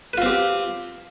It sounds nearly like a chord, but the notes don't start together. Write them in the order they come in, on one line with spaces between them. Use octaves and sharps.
B4 F4 C4 G4